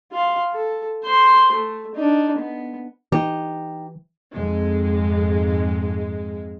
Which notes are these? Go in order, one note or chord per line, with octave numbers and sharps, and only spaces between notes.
F4 F5
A4
C5 C6
A3
D4 D#4
B3
E3 D#4 G4
F2 G#2 G#3